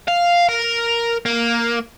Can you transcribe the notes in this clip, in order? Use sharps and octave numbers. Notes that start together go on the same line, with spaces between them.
F5
A#4
A#3